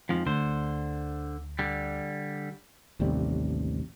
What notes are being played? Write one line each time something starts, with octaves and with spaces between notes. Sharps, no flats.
F2 G#2 F3
D2 D3 C5
D3 G3
A1 D#2 C3 G3